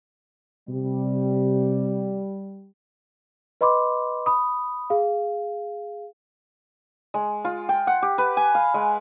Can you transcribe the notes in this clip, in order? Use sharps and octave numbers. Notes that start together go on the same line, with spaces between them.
C3 G3
B4 D#5 B5 C6 D6
B5 D#6
G#4 F5
G#3
F4
G5
F#5
G4
B4
G#5
F5
G#3